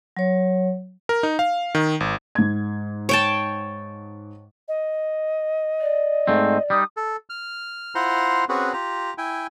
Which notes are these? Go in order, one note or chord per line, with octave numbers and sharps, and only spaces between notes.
F#3 C#5
A#4
D#4
F5
D#3
G#1
G#2 G#6
C#5 G5 A5
D#5
D5
G#2 A3 C4
G3 D#4 D#6
A4
F6
E4 F4 C5 F#5 A#5 C6
C4 C#4 F#4 G#4 B4
F4 G4 A#5
E4 G5 G#5